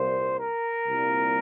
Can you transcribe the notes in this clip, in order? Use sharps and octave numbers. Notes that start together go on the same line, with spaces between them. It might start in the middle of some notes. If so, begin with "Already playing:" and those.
Already playing: C2 A#2 C5
A#4
C2 A#2